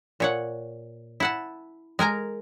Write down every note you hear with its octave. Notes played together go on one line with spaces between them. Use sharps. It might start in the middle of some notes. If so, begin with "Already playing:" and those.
A#2 C#5 F#5
E4 F#5 A5
G#3 A#4 G#5 A#5